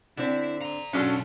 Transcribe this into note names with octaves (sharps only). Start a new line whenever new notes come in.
D3 C4 E4
D5 A#5
B1 F#3 C#4 D4 F4 A4